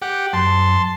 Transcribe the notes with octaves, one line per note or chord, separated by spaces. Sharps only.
G4 F#5
F#2 A5 C6